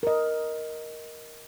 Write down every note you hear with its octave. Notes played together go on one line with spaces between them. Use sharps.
A#4 D#5